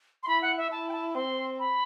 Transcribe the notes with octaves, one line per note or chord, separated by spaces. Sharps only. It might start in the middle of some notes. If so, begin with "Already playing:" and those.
C6
E4 B5
F#5
E5
E4 A5
G5
A5
C4 C6
B5